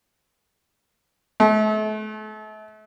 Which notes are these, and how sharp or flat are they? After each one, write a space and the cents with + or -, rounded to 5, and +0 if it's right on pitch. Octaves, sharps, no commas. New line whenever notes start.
A3 -40